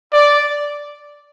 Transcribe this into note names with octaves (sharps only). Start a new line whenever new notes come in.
D5